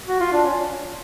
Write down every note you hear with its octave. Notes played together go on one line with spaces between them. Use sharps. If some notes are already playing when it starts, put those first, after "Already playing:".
F#4
F4
D4
C#4